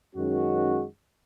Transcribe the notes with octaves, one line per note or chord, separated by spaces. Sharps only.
F#2 D#3 G#3 C#4 F#4